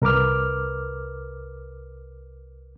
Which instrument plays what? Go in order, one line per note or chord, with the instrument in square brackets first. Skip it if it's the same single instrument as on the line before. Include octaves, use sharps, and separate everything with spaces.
[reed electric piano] C2 A#4 B4 D6 F6